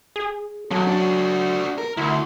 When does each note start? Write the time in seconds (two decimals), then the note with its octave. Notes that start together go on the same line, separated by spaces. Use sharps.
0.16 G#4
0.71 F#3 C#4 A4
0.87 D4 F#4
1.78 A#4
1.97 D2 E4